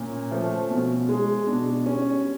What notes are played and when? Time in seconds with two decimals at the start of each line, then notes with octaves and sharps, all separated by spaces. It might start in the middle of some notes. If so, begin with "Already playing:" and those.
Already playing: A#2 C#4
0.31 F3 A3
0.70 B2
1.09 G#3
1.47 B2 D4
1.86 G3 C#4